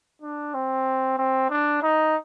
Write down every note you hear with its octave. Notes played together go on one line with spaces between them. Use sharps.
D4
C4
C4
D4
D#4